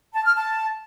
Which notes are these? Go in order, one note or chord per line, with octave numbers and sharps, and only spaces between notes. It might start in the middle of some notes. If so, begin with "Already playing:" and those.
A5
F6
A5